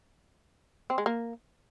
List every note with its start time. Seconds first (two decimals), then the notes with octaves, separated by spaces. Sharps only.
0.90 C4
0.98 G#3
1.06 A#3